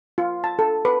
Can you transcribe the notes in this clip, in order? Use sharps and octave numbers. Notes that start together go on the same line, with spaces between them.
F4
A5
A4
B4